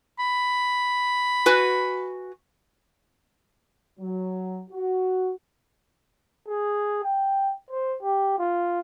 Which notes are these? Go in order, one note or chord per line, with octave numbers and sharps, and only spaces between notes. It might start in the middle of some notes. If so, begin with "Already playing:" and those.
B5
F#4 B4 G#5
F#3
F#4
G#4
G5
C5
G4
F4